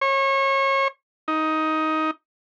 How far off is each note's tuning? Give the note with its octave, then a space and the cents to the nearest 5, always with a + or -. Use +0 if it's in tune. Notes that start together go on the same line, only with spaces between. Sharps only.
C#5 -30
D#4 +10